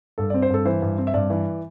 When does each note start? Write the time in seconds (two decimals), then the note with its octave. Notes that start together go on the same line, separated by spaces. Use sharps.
0.18 G2 A4
0.30 C4 D5
0.42 C5
0.50 G2 A4
0.66 E3 C5
0.82 G2
0.98 C4
1.07 E5
1.14 G2 D5
1.30 E3